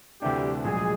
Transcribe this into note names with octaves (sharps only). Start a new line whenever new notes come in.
D2 C3 E3 G3 A3 D4 G4
A#1 A#2 F#3 G#3 G#4